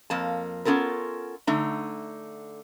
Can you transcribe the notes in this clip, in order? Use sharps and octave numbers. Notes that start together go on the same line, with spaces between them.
F2 A#3 A5
B3 C#4 F4 A4 A#4
D3 A3 D#4